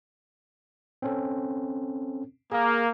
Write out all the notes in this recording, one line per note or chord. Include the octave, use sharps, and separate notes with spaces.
C4 C#4 A4
A#3 G#4